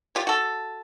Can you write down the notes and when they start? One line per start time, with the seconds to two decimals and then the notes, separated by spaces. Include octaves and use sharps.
0.15 F4 G4 C#5
0.27 F#4 A4